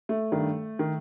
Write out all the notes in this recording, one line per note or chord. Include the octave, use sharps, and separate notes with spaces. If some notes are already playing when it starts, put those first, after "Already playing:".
A3
G2 D#3
D#3